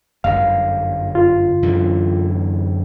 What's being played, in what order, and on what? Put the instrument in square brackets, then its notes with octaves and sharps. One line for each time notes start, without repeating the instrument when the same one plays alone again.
[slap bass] G1 F#2 [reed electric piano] F5
[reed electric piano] F4
[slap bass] F#2 D3 E3